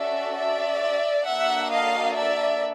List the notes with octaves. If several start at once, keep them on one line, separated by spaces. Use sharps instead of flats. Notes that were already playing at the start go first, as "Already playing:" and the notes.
Already playing: C#4 F#4 A4 D5 E5
D5 E5
A#3 D4 F#4 A4 E5 F#5
D#5 F5
D5 E5